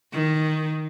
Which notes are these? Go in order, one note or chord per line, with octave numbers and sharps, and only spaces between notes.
D#3